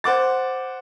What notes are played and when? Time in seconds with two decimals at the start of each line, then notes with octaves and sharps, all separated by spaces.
0.04 C5 F#5 D6 A6